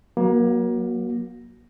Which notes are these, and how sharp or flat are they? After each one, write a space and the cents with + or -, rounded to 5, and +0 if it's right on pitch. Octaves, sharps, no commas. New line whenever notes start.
F#3 +0 A#3 +30 F#4 +0